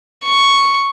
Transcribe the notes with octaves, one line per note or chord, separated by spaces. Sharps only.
C#6